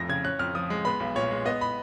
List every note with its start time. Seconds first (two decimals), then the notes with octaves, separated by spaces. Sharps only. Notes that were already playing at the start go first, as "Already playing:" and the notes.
Already playing: F1 F2 F3 A#6
0.09 C#3 G#6
0.24 C#4 F#6
0.39 F2 F6
0.55 F3 D#6
0.70 G#3
0.85 B3 B5
1.00 B1
1.15 A#2 C#5
1.31 G#3
1.45 B3 D#5
1.61 B5